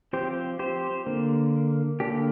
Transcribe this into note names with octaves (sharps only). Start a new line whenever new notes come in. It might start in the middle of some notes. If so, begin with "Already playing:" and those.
F3 C4 G4 C5
G4 C5
D3 A#3
D3 A#3 D4 G4